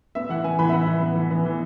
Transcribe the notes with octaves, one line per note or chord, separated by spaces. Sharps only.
B3 E5
E3 F#5
B3 G#5
E3 B5
E5
B3 F#5
E3
B3
E3
B3
E3